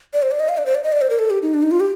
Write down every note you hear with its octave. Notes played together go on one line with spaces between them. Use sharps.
D5
C5
D5
D#5
F5
D5
C5
D5
D#5
D5
C5
A#4
A4
G4
D#4
D4
D#4
F4
G4